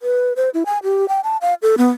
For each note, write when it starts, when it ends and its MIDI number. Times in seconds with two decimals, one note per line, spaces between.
0.02 0.33 71
0.36 0.50 72
0.54 0.63 64
0.66 0.78 80
0.83 1.08 67
1.08 1.21 79
1.24 1.37 81
1.42 1.54 77
1.62 1.76 69
1.78 1.90 59